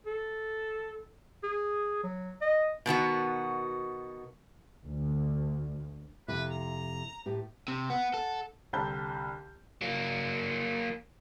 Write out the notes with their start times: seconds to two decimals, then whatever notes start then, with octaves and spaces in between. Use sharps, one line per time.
0.06 A4
1.44 G#4
2.03 F#3
2.41 D#5
2.86 B2 D#3 B3 F#4
4.83 D2
6.28 F2 C3 E4 B4
6.50 A#5
7.26 A2 G4 B4
7.68 C3
7.90 B3 F#5
8.14 A4
8.73 C2 D3 C4 A5 B5 G6
9.81 F#3 A#3